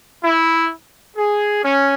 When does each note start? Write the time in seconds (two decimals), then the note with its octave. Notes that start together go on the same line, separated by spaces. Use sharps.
0.23 E4
1.16 G#4
1.64 C#4